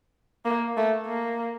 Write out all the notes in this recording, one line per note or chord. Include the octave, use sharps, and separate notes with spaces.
A#3
A3
A#3